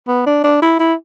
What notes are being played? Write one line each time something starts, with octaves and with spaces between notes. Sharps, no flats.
B3
D4
D4
E4
E4